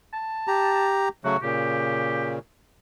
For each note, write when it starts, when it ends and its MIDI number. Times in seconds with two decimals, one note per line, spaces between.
0.13 0.88 81
0.48 1.09 67
0.48 1.09 82
1.24 1.37 49
1.24 1.37 54
1.24 1.37 57
1.24 1.36 66
1.42 2.39 46
1.42 2.39 49
1.42 2.33 67